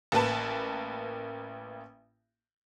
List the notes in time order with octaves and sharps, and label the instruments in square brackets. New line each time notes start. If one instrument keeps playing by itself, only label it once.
[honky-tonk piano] A1 A#3 B4 A5